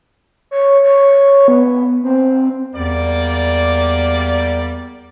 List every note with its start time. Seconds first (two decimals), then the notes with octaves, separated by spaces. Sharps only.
0.51 C#5
0.83 C#5
1.48 B3
2.03 C4
2.74 E2 G3 A#3 D5